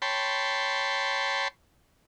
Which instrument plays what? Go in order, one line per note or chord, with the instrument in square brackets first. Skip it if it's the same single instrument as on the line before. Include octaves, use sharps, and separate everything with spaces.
[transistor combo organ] C#5 G5 A5 B5 C6